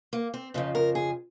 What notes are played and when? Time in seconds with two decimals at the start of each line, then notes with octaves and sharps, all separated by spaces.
0.13 A#3
0.34 C4
0.54 F2 C#3 F3 D#4
0.75 A#4
0.95 G#4